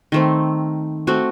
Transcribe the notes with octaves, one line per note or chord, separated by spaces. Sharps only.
D#3 A3 C4
A3 C4 F#4